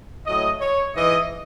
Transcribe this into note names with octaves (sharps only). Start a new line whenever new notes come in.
A2 F#3 D#5
C#5
G#2 E3 D#5